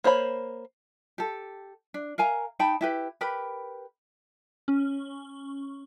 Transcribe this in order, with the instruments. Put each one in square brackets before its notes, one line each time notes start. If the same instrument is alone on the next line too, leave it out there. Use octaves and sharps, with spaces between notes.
[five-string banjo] A#3 C5 C#5 B5
[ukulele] G4 A4
D4
A#4 F5 G#5 A#5
D#4 G5 A5 B5
E4 G4 B4
G4 A#4 B4 B5
[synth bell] C#4